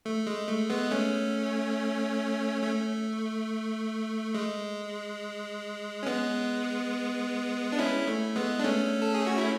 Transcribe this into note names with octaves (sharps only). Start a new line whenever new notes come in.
A3
G#3
A3
G#3 B3
A3 C#4
A3
G#3
C#4
G#3 B3
D4
C#4 E4
A3
G#3 B3
D4
A3 C#4
A4
G#4
F#4
E4